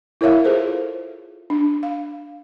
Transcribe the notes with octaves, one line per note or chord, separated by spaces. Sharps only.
E4 A#4 C#5 E5 F5
F4 G#4 A4 C5
D4
F5